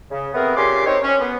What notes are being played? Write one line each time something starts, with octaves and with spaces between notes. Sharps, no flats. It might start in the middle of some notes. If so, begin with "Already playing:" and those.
C#3
A3 B3 C4 G#4 A#4
A#2 C#3 G4 G#5 C6 D6
C4 D#4 A#4 C5 C#5
C#4
B3